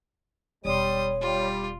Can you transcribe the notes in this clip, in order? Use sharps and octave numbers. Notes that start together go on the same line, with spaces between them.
E1 G3 C#5 C6 D#6
G3 F4